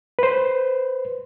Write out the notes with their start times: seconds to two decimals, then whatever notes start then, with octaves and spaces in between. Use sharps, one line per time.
0.19 B4 C5